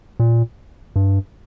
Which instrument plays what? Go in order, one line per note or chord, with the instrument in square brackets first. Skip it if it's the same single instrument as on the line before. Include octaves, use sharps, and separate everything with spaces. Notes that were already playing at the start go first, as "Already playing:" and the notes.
[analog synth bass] A#2
G2